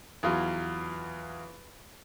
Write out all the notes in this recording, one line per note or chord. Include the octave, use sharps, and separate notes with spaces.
E2 F#3 F4